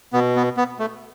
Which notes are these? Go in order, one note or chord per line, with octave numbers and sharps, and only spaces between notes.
B2 B3
B3
B3
A3